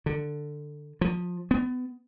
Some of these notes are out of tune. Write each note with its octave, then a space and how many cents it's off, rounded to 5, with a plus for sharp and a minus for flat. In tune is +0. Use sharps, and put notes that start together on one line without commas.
D3 +15
F3 +25
B3 +30